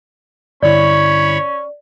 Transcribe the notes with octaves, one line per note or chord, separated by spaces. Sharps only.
G2 D3 C#4 E4 C#5 D5 B5